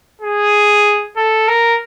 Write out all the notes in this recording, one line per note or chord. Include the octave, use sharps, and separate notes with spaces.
G#4
A4
A#4